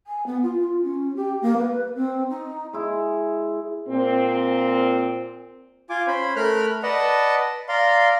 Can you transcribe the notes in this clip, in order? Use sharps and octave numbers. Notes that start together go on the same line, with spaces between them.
G#5
B3
F4
F4
C#4
G4
A#3
B4
C4
D#4
G#3 E4
A#2 C4
F4 G#5 D6
C#4 C5 B5
A3 A#4 B5 F6 F#6
B4 D5 D#5 F#5 A5
D5 F5 A#5 C6